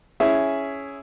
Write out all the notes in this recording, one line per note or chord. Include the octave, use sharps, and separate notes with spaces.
C#4 E4 G#4 E5